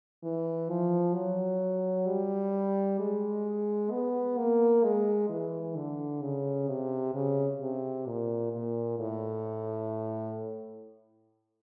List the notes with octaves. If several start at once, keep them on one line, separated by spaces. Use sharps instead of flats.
E3
F3
F#3
G3
G#3
B3
A#3
G#3
E3
D3
C#3
C3
C#3
C3
A#2
A#2
A2